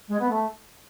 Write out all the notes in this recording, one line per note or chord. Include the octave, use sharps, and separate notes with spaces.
G#3
B3
A3